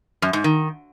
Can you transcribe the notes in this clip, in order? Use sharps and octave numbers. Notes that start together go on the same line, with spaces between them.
F#2
G#2
D#3